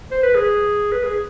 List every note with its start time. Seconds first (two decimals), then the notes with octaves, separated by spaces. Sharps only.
0.11 C5
0.23 B4
0.35 G#4
0.92 B4
1.04 G#4